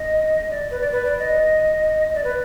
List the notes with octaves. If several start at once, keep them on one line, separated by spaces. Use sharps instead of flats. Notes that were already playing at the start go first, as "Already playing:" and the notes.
Already playing: D#5
D5
B4
D5
B4
D5
D#5
D5
B4